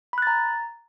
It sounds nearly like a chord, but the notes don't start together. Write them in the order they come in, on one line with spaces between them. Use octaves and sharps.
B5 F#6 A6 A#5